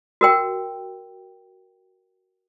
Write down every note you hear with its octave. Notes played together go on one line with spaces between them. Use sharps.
F#4 A#4 G5